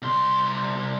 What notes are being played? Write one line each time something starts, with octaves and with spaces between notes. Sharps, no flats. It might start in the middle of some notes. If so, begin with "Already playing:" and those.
C2 C6